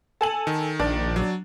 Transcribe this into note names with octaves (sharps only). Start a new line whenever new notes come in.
A4 G#5 F#7
D#3
A#1 D4
F#3